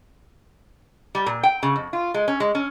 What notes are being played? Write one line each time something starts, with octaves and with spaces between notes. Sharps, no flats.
G3
A#2
G5
C#3
F2
F4
G#3
C#4
G#3
C#4